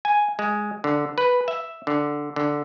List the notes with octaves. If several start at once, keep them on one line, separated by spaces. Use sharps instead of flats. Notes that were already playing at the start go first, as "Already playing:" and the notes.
G#5
G#3
D3
B4
E5
D3
D3